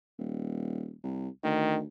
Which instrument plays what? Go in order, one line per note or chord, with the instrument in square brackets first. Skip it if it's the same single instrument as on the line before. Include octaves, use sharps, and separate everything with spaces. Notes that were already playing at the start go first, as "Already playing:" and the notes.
[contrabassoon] D#1
C2
[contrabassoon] D2 [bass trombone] D#3